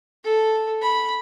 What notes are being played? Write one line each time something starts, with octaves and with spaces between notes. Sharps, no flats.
A4
B5